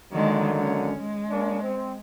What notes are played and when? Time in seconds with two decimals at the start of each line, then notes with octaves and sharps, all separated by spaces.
0.13 D3 D#3 F#3 G#3 A#3
0.54 G#3 C#4
0.98 G#3
1.30 A#3 C#4 D4
1.62 C4